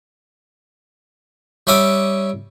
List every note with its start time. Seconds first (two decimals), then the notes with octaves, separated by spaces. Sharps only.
1.67 G3 C#4 E5 D6 D#6